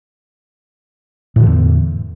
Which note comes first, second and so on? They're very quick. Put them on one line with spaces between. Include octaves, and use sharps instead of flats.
A2 D3 E3 E2